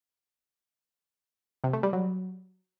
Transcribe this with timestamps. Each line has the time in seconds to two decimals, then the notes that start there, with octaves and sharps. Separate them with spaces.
1.64 C3
1.73 A3
1.83 G3
1.93 F#3